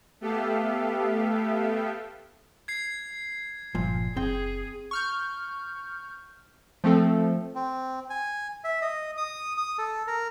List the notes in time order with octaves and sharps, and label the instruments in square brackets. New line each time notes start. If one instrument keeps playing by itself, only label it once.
[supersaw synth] A3 B3 G4 A4 E5 F5
[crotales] G#6 C7
[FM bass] G1 [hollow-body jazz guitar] A#2 F3
[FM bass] F#1 [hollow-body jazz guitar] C4 G5 [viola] G#4
[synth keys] C#6 F6 G6
F3 A3 C4 A4
[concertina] C4
G#5
E5
D#5
D#6
D#6
A4
A#4